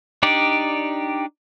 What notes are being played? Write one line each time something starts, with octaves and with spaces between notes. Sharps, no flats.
D4 D#4 G4 D5